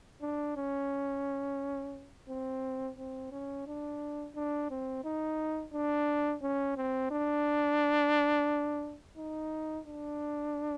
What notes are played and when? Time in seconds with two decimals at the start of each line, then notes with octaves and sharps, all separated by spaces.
0.22 D4
0.57 C#4
2.29 C4
2.98 C4
3.32 C#4
3.67 D4
4.36 D4
4.71 C4
5.04 D#4
5.73 D4
6.42 C#4
6.77 C4
7.11 D4
9.18 D#4
9.87 D4